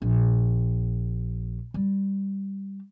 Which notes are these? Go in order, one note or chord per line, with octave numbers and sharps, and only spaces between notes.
A#1
G3